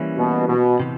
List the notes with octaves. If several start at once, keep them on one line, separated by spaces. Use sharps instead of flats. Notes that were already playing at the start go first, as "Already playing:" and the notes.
Already playing: E3 G3 A#3 C#4 E4
B2
B2
C3 E3